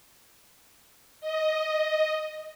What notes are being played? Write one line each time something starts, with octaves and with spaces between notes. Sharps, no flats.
D#5